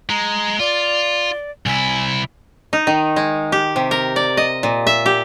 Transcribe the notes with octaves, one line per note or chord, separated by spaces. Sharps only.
G#3 A#5
F4 D5
C2 E4 G#5
D#4
D#3
G#3
G4
C3
A#4
D5
D#5
A#2
E5
G4